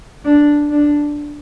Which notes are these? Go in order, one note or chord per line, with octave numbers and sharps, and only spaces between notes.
D4
D4